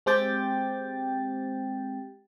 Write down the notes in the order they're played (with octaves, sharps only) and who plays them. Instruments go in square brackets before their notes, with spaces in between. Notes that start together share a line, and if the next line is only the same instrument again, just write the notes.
[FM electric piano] G#3 C4 G4 G5 A6